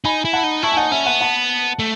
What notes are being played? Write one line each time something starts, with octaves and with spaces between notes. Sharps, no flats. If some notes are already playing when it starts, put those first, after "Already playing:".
D#4 G#5 B5
E4
F#5 A5
D#4
E4 A5 C#6
G#5
D#4 F#5 A5
C#4 E5 G#5
B3 F#5 A5
F#5 A5
A3